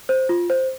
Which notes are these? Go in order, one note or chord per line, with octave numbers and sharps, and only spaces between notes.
C5
F4
C5